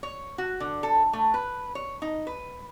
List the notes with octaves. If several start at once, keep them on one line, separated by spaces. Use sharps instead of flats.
C#5
F#4
D3
A4
A3
B4
C#5
D#4
B4